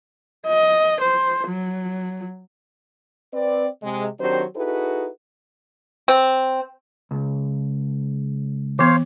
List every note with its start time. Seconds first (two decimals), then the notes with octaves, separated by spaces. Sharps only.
0.47 D#5
1.00 C5
1.48 F#3
3.33 C4 B4 D5
3.82 C3 G#3
4.20 D#3 F#3 C4 D4 G4 C5
4.55 D#4 E4 F#4 G#4 A4 B4
6.08 C4
7.11 C#2
8.79 E3 B3 C5 C#5 F5